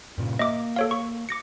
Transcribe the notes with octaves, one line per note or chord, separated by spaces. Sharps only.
G2 A#2 C#3
A#3 D#5 E5 D6
A4 C#5 F5
C#6
D6 A#6 C#7